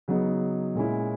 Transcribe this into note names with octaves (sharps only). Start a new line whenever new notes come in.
C#3 F#3 B3 D#4
A#2 G#3 C#4 E4